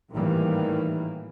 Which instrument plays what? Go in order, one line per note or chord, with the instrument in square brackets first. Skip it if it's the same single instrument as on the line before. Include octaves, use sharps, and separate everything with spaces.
[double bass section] G#1 A2 D#3 E3 G3 A#3